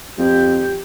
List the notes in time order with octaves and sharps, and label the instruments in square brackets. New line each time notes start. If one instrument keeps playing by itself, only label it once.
[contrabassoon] F2 [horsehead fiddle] G4